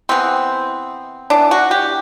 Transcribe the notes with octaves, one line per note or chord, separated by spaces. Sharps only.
C3 E3 B3 C4
E3 B3 D4
F#4
G4